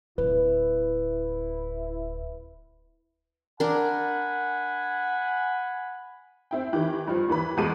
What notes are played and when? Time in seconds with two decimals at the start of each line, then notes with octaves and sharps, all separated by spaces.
0.18 D1 E4 B4
3.60 D4 A#4 F#5 G#5 B5
6.51 C4 E4 G5
6.73 D#3 E3 G4
7.08 G2 F3
7.28 D#2 E3 B4 B5
7.57 E2 B2 G#3 A4 D6 D#7